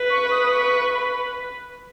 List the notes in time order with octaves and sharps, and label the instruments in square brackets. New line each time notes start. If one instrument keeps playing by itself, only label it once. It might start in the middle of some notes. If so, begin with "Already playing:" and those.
Already playing: [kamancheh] B4
[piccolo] C#6
D#6
C#6
B5